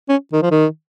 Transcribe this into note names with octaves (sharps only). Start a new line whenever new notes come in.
C#4
D#3
F3
D#3